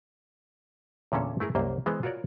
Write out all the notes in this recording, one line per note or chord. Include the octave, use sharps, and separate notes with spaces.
E2 A#2 D3 C#4 A4
A3 E4 G#4 A#4
C2 F#2 A#3 C5 D#5
E3 G#3 B3 C5
F4 F#4 A#4 C#5 D5